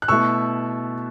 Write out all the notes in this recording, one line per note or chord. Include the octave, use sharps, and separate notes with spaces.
F#6
B2 A3 E4 C#6 E6